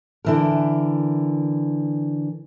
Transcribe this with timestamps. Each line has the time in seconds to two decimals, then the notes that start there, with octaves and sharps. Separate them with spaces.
0.25 D3 E3 A#4